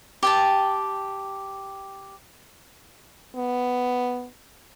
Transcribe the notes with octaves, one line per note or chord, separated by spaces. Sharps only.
G4 G5 A5
B3